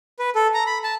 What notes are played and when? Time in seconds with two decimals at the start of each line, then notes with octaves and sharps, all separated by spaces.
0.19 B4
0.35 A4
0.54 A#5
0.67 B5
0.84 A5